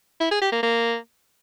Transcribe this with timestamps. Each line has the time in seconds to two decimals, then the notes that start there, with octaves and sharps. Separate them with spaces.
0.21 E4
0.31 G#4
0.42 G4
0.52 A#3
0.63 A#3